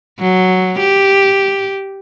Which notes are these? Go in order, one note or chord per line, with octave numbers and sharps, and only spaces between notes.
F#3
G4